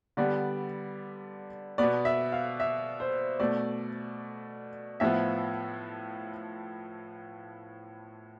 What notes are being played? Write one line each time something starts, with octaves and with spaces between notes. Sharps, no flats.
D3 G3 B3 D5
B2 B3 D5
E5
F5
E5
C5
B2 A3 D5
A2 F3 B3 E5